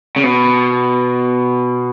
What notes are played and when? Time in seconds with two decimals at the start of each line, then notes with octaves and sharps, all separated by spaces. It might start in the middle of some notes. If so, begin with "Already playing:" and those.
0.16 C#3
0.24 B2